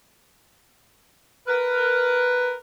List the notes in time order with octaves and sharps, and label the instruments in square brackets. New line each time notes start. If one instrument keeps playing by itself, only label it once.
[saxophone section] A#4 B4